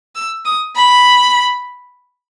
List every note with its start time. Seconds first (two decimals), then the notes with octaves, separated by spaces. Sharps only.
0.15 E6
0.45 D#6
0.77 B5